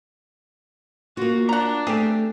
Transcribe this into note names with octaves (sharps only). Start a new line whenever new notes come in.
A#3 F4 F#4
D4 F#5 A#5
A3 C4 G4 G#4